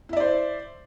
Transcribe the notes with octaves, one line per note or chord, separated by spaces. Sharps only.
E4 C5 D5 E5